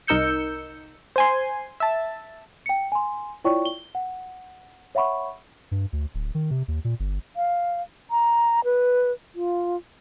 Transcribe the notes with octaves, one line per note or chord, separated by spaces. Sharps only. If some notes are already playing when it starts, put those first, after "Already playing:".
C2 D#4 A#4 E6 G6 C#7
C5 G#5 C6
E5 A5
G5 C#7
G#5 C6
E4 F4 C#5 D5 G5 C#6
G7
F#5
C#5 E5 F#5 B5 C#6
G2
D2
D1
D#3
C3
D#2
A#2
G1
F5
A#5
B4
F4